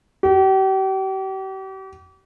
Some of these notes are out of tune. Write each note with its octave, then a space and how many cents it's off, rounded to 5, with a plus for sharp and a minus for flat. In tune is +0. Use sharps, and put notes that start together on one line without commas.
G4 -40